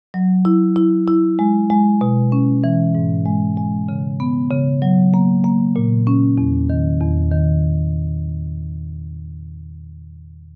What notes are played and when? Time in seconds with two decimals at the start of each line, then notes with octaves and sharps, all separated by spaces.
0.14 F#3
0.45 E4
0.76 E4
1.08 E4
1.39 G#3
1.70 G#3
2.01 B2
2.32 C#4
2.64 E3
2.95 G#2
3.26 G#3
3.57 G#3
3.89 C#3
4.20 B3
4.51 C#3
4.82 F#3
5.14 A#3
5.44 A#3
5.76 A#2
6.07 C#4
6.38 E2
6.70 D#3
7.01 E2
7.31 D#3